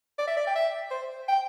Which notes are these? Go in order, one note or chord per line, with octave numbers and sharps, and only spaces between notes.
D5
E5
D5
G5
E5
C5
G5